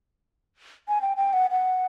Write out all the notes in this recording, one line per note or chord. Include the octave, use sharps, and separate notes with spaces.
G#5
G5
G5
F#5
F#5